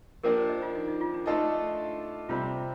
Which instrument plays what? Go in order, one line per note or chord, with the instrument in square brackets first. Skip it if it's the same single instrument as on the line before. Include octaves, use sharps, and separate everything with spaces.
[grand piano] F3 A#3 D4 G4 [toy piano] A#4
[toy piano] C5
D#5
F4
D#4
D#4
F4
D4
[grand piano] A3 D4 F4 A4 D#5 [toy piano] D#4
[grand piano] C3 G3 C4 [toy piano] F4